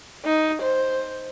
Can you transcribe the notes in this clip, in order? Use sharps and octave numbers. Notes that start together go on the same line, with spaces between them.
D#4
C5